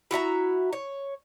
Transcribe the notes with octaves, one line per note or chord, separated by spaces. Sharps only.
E4 F#4 E5 A#5
C#5